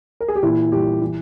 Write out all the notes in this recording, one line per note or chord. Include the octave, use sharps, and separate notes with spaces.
A#4
G#4
G4
A#2 E3 E4
A#2 G3 G4
E3